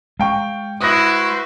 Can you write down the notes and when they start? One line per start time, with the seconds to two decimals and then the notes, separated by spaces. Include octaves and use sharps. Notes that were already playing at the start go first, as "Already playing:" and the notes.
0.19 G#3 F5 G5 C#6
0.81 E4 F#4 B4 C5 D#6 F#6 A#6